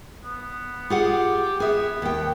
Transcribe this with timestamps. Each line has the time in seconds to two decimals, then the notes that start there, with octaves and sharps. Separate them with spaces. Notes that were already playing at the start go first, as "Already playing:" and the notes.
0.24 B3
0.90 F4 G4 G#4 F#5
1.60 B3 G#4 E5
2.02 D#2 G5